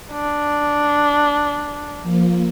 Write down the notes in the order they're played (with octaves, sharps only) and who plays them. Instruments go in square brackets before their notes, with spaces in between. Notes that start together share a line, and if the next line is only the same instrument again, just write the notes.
[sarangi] D4
[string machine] F3 A#3